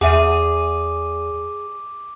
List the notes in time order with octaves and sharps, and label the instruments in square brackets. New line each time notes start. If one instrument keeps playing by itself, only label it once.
[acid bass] E2 [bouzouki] G#4 [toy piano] E5 F#5 [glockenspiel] D6 D#7